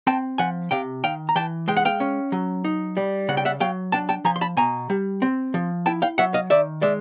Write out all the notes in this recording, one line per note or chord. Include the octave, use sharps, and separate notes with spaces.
C4 G5 A5
F3 F#5 G#5
C3 F5 G5
D#3 F5 G5
A#5
E3 G5 A5
G#3 G5
F#5
F5 G5
C#4
F#3
D#4
G3
C#3 F#5
G5
E5 F#5
F#3 F5 G5
D4 G5 A5
G5 A5
F3 G#5 A#5
C6
A5 B5
B2 G#5 A#5
G3
C4
F3
E4 G5 A5
F5 G5
F#3 E5 F#5
D#5 F5
D#3 D5 E5
G#3 D5 E5